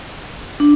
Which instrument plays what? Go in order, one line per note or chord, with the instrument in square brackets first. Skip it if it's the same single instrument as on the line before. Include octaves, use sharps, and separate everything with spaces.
[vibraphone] D4